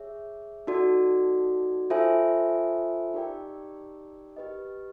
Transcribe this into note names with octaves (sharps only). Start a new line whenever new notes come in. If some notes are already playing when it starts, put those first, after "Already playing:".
Already playing: G#4 C#5 E5
D#4 F#4 A4 D5
F4 A4 C5 E5 G#5
D#4 G4 A#4 D5 G5
G4 B4 D#5